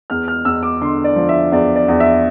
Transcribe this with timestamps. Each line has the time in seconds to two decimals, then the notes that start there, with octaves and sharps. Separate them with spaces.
0.10 E2 F6
0.28 F6
0.45 E2 E6
0.63 D6
0.81 D3 C6
1.04 D5
1.16 F3
1.29 E5
1.52 E2 D5
1.75 D5
1.88 E2
2.00 E5